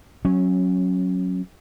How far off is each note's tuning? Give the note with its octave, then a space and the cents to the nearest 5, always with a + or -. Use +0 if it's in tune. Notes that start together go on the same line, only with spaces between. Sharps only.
F#3 +0 C#4 -15